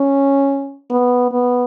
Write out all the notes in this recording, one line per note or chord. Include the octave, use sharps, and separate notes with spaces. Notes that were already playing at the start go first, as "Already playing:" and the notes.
Already playing: C#4
B3
B3